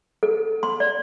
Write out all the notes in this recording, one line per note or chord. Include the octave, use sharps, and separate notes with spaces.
A4
C6
D5